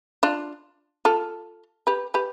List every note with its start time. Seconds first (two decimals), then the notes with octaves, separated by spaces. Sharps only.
0.23 D4 F4
1.05 F4 A4
1.87 G4 B4
2.14 G4 B4